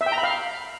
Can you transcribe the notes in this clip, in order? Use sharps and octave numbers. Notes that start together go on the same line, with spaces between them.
E5
G5
A#5
B5
F5